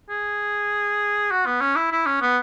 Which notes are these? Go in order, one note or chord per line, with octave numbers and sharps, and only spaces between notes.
G#4
F#4
B3
C#4
E4
E4
C#4
B3